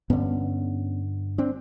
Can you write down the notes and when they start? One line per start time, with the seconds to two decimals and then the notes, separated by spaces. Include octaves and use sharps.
0.10 G2 D3 B3 C#4
1.38 C4 D4